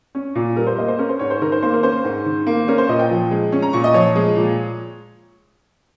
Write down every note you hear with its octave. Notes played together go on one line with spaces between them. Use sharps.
C#4
A#2
G3 A#4
C5
A#3 D#5
C5
C#4 A#4
C5
G#2 C#5
C5
D#3 A#4
C5
A#3 C5
A#4
C#4 C5
G#2
D#3
A#3
C#4 A#4
C5
A#2 D#5
G5
F3
G#3
C#4
A#5
A#2 C#6
D#5
F3 C#5
G#3
A#2